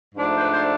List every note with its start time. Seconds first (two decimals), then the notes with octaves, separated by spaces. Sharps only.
0.15 G#2 F3 A3 D4
0.36 C5
0.39 B4
0.51 C5